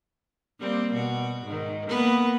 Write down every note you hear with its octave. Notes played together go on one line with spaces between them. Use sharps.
G3 A#3 C4
B2 F#4
G#2 D#3
A#3 B3 B4